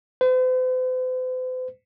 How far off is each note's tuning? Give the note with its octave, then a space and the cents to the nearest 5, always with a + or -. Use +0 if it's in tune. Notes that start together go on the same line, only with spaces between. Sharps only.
C5 -45